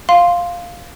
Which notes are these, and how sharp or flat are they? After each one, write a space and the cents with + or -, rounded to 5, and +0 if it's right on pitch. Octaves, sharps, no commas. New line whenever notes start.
F5 +0 C6 +0